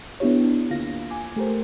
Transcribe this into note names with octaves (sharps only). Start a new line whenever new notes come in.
B3 D4 E4 G4 C#5
D4
D2 A#3 F4 F5 A#6
G#5 D6
A3 G4 A#4 C5